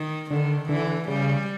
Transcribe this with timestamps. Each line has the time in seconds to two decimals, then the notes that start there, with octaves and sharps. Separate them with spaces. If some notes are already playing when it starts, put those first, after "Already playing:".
Already playing: D#3
0.30 D3 D#3
0.69 D3 E3
1.08 C#3 G3